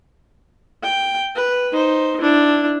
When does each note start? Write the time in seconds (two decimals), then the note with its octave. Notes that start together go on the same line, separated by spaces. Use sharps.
0.83 G5
1.35 B4
1.72 D#4 C5
2.21 D4 E4